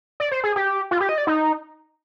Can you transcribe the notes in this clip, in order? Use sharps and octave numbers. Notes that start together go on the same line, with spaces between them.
D5
C5
G#4
G4
F4
G4
D#5
D5
D#4